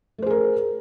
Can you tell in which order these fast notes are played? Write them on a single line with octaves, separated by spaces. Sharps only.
A3 C5 G#4 A#4